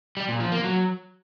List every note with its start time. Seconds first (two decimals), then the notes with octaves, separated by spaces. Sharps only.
0.17 G3
0.28 A#2
0.40 F3
0.52 A#3
0.64 F#3